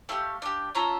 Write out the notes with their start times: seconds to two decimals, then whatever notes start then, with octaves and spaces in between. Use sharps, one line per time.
0.09 A3 E4 G4 F5
0.42 D4 G4
0.75 C#4 F4 A4 A#5